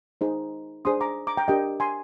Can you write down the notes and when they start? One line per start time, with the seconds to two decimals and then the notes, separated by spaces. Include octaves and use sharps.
0.21 D#4 G#4 C5
0.85 D4 G#4 C5 C6 D#6
1.01 A#5 D6
1.27 A#5 D6
1.37 G5 A#5
1.48 D4 G4 A#4 D#5 G5
1.80 G#5 C6